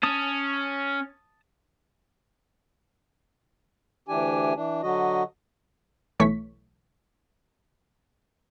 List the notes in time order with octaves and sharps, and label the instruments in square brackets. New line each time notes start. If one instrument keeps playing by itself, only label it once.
[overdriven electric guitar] C#4 [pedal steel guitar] A5 D#6
[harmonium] D2 E3 D4 G4 G#5
E3 D4
D3 F#3 F#4 D#5
[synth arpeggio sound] B1 E3 A3 C#5 C#6 B6